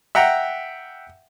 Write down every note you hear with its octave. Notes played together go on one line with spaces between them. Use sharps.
E5 F#5 G5 A#5